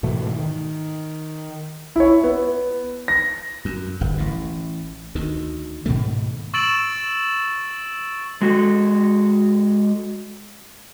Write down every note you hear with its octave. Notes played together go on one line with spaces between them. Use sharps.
G#2 B2 E3 A3
D#3
E4 C#5
B3
A#6
F#2
D1 G1 G2
A1 A2
D2 D#3
G#2 B2 D#3 A3
C#6 E6 A6 D7 E7 F#7
G#3 F#4 A4